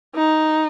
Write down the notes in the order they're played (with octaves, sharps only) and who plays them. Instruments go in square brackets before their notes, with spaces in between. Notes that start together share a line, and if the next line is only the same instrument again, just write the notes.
[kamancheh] D#4